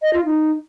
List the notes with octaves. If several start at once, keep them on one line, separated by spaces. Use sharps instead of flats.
D#5
F4
D#4